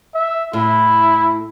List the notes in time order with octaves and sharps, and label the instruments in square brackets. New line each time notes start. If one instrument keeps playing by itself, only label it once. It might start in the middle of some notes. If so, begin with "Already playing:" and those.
[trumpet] E5
[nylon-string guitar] A2 [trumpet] E4